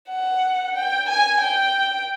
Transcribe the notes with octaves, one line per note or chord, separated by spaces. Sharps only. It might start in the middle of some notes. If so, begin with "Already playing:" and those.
F#5
G5
G#5
G5